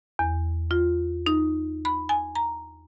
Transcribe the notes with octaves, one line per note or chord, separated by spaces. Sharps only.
E2
F4
D#4
B5
G#5
A#5